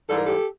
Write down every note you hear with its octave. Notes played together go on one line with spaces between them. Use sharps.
G#2 E3 G3 A4
A#4
G4 A4